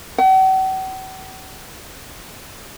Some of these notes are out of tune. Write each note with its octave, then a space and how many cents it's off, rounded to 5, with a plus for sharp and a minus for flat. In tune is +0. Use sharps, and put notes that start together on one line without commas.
F#5 +45